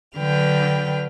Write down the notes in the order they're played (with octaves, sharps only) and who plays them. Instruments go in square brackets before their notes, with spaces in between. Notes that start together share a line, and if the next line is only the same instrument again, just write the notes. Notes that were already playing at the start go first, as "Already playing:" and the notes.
[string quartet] D3 F#3 B4 G5 F6